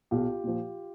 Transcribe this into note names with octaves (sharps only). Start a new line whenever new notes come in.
B1 F4 G4
A#2 F3